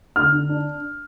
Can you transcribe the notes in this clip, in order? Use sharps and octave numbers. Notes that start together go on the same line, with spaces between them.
D3 F6
D3
D4